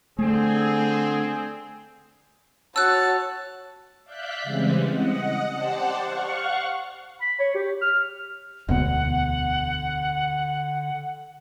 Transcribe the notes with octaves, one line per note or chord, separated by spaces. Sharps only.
D3 A3 C4 G#4
F#4 C#5 A5 E6 F#6
D5 E5 F5 F#6 G6 B6
C#3 E3 G3 G#3 C4
D#5 F#5
G4 C5 D5 F#5 A5
F5 F#5 C#6
B5
C#5
G4
F6
E1 D2 D3 B3 F#5